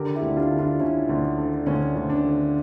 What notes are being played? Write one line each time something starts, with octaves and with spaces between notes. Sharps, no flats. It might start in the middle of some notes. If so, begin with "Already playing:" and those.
Already playing: D3 G4 A#4
E4 G4
D2
D4 F4
D3
D4 F4
D3 C#4 E4
D2
D3
D2 C#4
D2
D4
D3